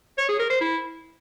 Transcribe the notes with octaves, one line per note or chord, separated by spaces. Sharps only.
C#5
G#4
A#4
C5
E4